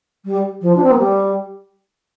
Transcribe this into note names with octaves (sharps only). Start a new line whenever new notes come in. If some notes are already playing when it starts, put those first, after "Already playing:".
G3
F3
D4
C4
A#3
G3